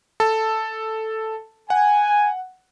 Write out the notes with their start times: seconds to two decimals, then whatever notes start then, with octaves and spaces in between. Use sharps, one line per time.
0.20 A4 A5
1.70 F#5 G#5